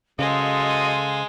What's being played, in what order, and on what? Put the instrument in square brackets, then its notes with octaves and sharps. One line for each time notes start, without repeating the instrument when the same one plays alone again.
[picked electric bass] C#3 [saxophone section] F#3 D#5 [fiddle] G#3 [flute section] A4 C5 F5